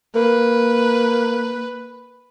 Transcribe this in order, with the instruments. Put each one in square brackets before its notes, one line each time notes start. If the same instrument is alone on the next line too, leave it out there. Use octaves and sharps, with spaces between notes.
[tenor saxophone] A#3 [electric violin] B4